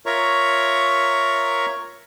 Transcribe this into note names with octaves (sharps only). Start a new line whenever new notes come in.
F4 A#4 C#5 E5 A#5 C#6